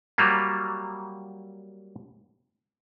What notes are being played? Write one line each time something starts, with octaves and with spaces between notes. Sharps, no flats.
F#3 G3 A#3